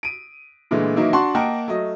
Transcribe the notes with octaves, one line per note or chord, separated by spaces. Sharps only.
D7 D#7
A#2 D3 E3 G#3 A3
D#3 E3 F#3 A#3 D#4 E4
D4 F#4 F#5 A5 C6 C#6
A#3 A#4 D#5 F#5 G5 A5
F#3 A3 D#5